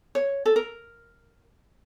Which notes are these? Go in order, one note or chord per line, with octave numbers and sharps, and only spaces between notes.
C#5
A4
A#4